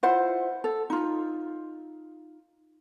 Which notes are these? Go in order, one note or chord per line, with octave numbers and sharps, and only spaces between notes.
E4 F4 C5 F#5
A4
D#4 F4